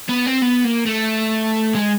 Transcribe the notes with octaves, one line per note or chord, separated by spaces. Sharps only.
B3
C4
B3
A#3
A3
G#3